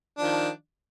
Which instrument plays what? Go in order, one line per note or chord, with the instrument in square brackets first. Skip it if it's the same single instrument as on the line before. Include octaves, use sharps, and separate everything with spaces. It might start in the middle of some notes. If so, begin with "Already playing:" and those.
[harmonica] D4
F3
D#3